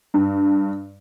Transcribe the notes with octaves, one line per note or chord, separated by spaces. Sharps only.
G2